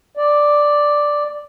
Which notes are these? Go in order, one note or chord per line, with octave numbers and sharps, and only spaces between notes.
D5